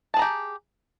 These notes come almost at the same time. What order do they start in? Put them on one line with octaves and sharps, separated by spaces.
A5 G#4 A#5 G4